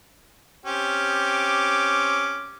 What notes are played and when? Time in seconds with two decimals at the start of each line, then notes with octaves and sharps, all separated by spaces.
0.66 C4 C#4 G4
1.13 D6